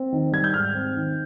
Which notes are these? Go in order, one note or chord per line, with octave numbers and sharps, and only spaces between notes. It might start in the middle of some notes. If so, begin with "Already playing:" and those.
Already playing: C4
D#3
G3 G#6
G6
G#2 F6
C4
D#3